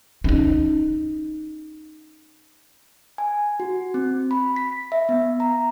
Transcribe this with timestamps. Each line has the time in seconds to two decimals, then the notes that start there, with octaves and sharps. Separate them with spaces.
0.24 C#4 D#4
3.18 G#5
3.60 F#4
3.94 C4
4.31 B5
4.56 B6
4.92 E5
5.09 B3
5.40 A#5